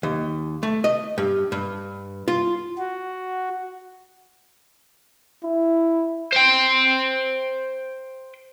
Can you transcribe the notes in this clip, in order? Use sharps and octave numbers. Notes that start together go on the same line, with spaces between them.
D#2
A3
D#5
G2
G2
F4
F#4
E4
C5 G5